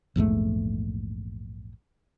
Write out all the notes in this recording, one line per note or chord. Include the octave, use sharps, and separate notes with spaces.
A#1 E2 G#2 A3